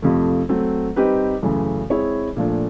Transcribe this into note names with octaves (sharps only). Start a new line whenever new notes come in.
F2 C3 F3 A3
F#3 A3 C4
G3 C4 D#4 G4 B4
F#2 C#3 E3 A3
G#3 C4 E4 G#4 C#5
A#2 F3 A3 D4